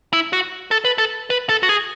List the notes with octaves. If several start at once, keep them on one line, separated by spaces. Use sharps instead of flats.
E4
F#4
A4
B4
A4
B4
A4
F#4
G#4